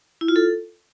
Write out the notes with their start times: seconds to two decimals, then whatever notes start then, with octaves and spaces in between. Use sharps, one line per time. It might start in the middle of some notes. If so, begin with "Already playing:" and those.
0.21 E4
0.28 F4
0.36 A4